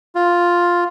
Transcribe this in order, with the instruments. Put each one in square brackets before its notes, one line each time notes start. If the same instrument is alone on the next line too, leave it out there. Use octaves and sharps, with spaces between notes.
[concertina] F4